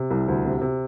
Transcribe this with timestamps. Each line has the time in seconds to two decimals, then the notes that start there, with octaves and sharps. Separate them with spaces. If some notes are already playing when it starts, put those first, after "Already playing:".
Already playing: C3
0.11 C2
0.28 D2
0.45 C3
0.62 C3